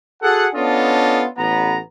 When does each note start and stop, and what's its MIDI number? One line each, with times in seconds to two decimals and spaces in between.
0.22 0.47 66
0.22 0.47 68
0.22 0.47 69
0.22 0.47 78
0.55 1.25 59
0.55 1.25 61
0.55 1.25 62
0.55 1.25 65
0.55 1.25 69
0.55 1.25 75
1.37 1.78 33
1.37 1.78 59
1.37 1.78 82